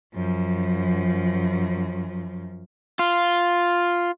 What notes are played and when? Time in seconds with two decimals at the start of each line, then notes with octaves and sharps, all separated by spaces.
0.14 F#2 F3
2.99 F4